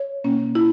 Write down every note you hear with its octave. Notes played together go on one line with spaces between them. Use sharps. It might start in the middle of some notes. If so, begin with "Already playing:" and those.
Already playing: C#5
B2 A#3 C#4
E4